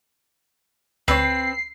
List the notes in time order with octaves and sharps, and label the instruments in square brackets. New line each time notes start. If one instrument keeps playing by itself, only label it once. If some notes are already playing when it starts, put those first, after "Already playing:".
[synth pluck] D2 C#5 [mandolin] C4 [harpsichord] B4 [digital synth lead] C7